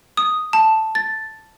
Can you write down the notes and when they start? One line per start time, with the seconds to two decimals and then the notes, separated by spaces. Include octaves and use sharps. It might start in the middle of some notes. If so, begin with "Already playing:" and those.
0.17 D#6
0.53 A5
0.95 A6